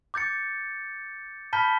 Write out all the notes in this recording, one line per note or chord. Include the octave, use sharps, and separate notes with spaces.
D6 G6 A6 C#7
A5 B5 F6 G6 B6 G7